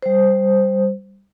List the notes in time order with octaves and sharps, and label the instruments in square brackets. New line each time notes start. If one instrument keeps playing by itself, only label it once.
[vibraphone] G3 C5